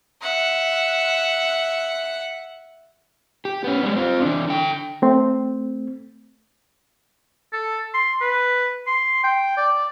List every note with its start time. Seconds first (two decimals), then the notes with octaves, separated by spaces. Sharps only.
0.22 E5 F#5
3.45 G4
3.64 B3 C#4
3.83 G3 G#3
3.96 C4 F4
4.22 E3 D4
4.48 D3 G5
5.02 A3 C4
7.53 A4
7.94 C6
8.21 B4
8.87 C6
9.23 G5
9.57 D5